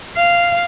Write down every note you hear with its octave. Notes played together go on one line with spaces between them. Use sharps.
F5